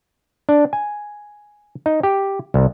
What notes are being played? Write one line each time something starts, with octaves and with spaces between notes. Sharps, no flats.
D4
G#5
D#4
G4
C2